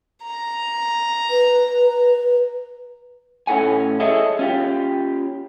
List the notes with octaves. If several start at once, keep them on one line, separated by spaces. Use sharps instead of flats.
A#5
B4
A2 C#4 E4 A4 F#5 G#5
G#4 A4 C#5 D#5 E5
C#4 F4 G4